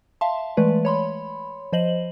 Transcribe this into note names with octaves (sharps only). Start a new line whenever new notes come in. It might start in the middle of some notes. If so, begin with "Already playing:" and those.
E5 F5 A5 C6
E3 G#3 A3 B4 D5
C#5 B5 C6
F3 C5 D#5 F#7